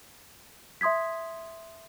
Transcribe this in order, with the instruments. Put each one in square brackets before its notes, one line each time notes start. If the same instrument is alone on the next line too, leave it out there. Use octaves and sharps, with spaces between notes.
[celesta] E5 C6 D#6 G#6 B6